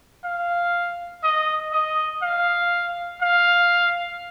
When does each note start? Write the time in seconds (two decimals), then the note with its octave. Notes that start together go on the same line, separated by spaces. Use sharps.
0.24 F5
1.23 D#5
1.73 D#5
2.23 F5
3.22 F5